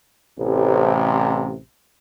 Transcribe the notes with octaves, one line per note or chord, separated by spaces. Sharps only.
A1 C3